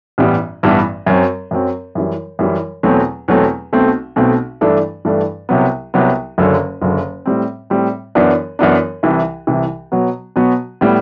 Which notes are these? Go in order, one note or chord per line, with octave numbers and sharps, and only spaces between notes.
A1 G2 E3 G3 B3
A1 G2 E3 G3 B3
F#2 F#3 C4
F#2 F#3 C4
F#2 E3 G3
F#2 E3 G3
E2 B2 F#3 A3 C4
E2 B2 F#3 A3 C4
B1 B2 A3 C4
B1 B2 A3 C4
G2 E3 A3 D4 A4
G2 E3 A3 D4 A4
C2 C3 F#3 B3
C2 C3 F#3 B3
F#1 F#2 D3 F#3
F#1 F#2 D3 F#3
A2 G3 C4
A2 G3 C4
F#2 E3 B3 D4
F#2 E3 B3 D4
C2 C3 E3
C2 C3 E3
B2 F#3 B3 F#4
B2 F#3 B3 F#4
A2 G3 B3